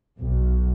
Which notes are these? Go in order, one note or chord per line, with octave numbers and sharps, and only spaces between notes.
B1